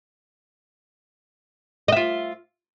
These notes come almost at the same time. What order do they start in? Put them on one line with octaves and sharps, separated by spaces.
D#5 E5 F4